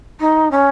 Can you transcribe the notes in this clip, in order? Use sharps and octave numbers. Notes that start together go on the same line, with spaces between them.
D#4
C#4